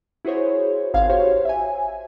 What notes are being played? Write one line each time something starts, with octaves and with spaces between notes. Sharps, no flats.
E4 F#4 G#4 C5 C#5
G#1 F5 G#6
F#4 G4 C5 C#5
E5 G#5